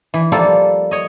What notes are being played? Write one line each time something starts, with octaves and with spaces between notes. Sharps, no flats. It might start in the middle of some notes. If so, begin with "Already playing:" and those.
E3
F3 G3 A#3 F4 A4 D5
C#5 D#5